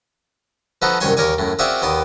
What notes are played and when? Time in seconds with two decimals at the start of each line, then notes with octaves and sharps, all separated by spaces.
0.82 F3 B3 D#4 F#4 A4 B4
1.00 C2 F#2 D#3 C#5 G#5 C6
1.17 D#2 A#4 C#5 D5 G#5
1.38 F#2 A2
1.59 C4 F4 F#4 G#4 D5 E5
1.82 D#2 D#3 B3 D5 D#6